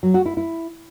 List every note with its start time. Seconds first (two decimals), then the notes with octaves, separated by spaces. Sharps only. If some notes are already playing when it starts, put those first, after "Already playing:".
0.03 F#3
0.14 F#4
0.26 E4
0.37 E4